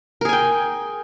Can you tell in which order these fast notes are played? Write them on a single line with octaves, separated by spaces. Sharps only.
A#4 G#4 G#5 G5